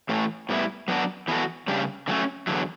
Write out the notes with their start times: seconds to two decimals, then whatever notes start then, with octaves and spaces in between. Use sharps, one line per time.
0.09 A2 E3 A3
0.49 A2 G3 B3 E4
0.88 F#3 B3 D4 F#4
1.28 E3 B3 F#4 A4
1.68 C#3 G3 D4 G4
2.08 D3 F#3 A3 C#4
2.47 E2 D3 F#3